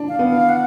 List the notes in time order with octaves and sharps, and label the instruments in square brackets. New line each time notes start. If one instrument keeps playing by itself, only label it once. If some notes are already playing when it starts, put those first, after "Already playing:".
Already playing: [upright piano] D4
[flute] F5
[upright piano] B3
[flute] F5
F#5